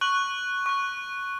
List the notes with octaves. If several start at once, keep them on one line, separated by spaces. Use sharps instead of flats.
C#6 F#6 F#7
C#6 F#6